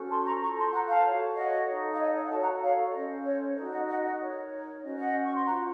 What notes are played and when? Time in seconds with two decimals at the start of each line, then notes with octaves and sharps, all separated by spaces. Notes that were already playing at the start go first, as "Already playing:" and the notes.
Already playing: C#4 F#4 A4 C5
0.09 A5 C6
0.25 A#5 C#6
0.41 F4 A4 C5 A#5 C#6
0.56 A5 C6
0.73 F#5 A#5
0.89 F5 A5
1.04 F#4 A4 C#5
1.36 D#5 F#5
1.68 D#4 A4 C#5
1.93 F5
1.99 D#5
2.15 C#5 F5
2.24 F#5
2.30 F#4 A4 C#5 F5 A5
2.40 F#5 A#5
2.62 C#5 F5
2.93 C#4 A4 C5 D#5
3.25 C#5
3.56 D#4 F#4 A4 D#5
3.72 D#5 F#5
3.88 D#5 F#5
4.04 D#5
4.20 D#4 A#4 C#5
4.83 C#4 F#4 C5 D#5
4.98 D#5 F#5
5.25 C#6
5.34 C6
5.45 C5 F#5 A#5
5.49 F4